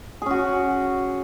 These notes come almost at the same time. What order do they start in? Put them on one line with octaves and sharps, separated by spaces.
G#4 C#4 F#4